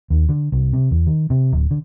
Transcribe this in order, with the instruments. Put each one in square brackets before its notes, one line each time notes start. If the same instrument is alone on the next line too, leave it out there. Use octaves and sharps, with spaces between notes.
[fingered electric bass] D#2
D3
C2
C3
E2
D#3
C3
D1
D3